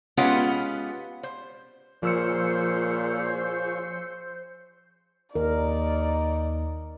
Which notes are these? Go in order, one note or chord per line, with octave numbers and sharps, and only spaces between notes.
G#3 B3 C#4 F4 G4 F#5
C5
A#2 F3 F4 G#4 C5 C#5 E6 C#7
D#2 D#4 A#4 D5